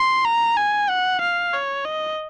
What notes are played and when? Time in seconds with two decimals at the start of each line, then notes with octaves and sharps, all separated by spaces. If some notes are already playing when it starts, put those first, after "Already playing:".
Already playing: C6
0.25 A#5
0.57 G#5
0.89 F#5
1.21 F5
1.53 C#5
1.85 D#5